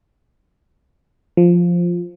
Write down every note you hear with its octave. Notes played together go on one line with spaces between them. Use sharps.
F3